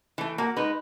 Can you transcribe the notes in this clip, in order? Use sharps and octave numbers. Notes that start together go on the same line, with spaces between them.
E3 A3
A#3 F#4
G#3 D#4 B4